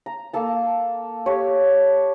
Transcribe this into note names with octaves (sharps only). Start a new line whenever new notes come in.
A#5
A#3 A4 A5
G4 A4 C#5